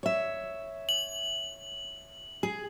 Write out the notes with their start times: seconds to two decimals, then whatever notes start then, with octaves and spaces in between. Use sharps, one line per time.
0.03 C#5 E5
0.89 F#7
2.43 G#4